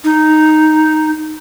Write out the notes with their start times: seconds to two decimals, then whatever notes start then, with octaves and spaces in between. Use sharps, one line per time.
0.04 D#4